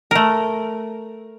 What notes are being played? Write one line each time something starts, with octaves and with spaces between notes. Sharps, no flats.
A3 A#4